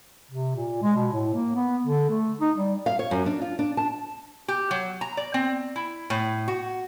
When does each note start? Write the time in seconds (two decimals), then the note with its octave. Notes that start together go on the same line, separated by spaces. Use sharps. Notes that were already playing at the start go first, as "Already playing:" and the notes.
0.31 C3
0.56 A#2
0.83 G#3
0.96 B2
1.13 A2
1.34 A#3
1.55 B3
1.86 D3
2.10 A3
2.41 D#4
2.56 G3
2.86 F5
2.99 C#5
3.11 F#2
3.26 D4
3.41 F4
3.59 D4
3.77 A5
4.48 G4
4.71 F#3
5.01 A#5
5.17 D5
5.34 C4
5.76 E4
6.10 A2
6.48 F#4